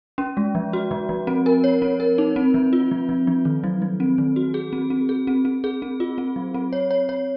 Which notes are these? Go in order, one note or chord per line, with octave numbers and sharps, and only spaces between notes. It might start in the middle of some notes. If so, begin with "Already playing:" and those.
C#4
G#3
F3
F#4
F3
F3
C4
A#4
C#5
C4
A#4
D#4
C4
F3
F4
F3
F3
F3
D#3
F#3
F#3
C4
D#3
F#4
G#4
C4
C4
G#4
C4
C4
G#4
C4
F4
C4
F#3
C4
C#5
C#5
C#5